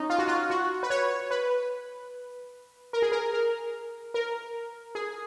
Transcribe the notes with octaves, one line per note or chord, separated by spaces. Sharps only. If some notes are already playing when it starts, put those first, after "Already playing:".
Already playing: C#4 D#4
F4
F#4
F4
F#4
B4
C#5
B4
A#4
G#4
A#4
A#4
A#4
G#4